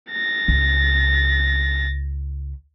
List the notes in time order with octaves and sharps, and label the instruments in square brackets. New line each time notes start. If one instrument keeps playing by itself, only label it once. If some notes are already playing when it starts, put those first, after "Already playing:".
[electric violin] A6 A#6
[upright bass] C#2